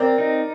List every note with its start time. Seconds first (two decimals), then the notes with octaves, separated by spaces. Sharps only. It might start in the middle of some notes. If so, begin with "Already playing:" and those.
Already playing: C4 A#4 D5
0.18 D#4